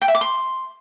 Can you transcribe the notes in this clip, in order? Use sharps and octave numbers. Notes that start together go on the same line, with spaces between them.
G5
E5
D6
C6